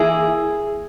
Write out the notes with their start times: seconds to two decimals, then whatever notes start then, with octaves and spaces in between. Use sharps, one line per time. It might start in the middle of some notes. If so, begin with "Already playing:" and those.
Already playing: E3 A#3 E4 G#4